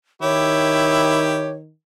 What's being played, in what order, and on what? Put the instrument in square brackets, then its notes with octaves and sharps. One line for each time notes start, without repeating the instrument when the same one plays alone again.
[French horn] D#3 [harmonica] E4 G4 [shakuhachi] C#5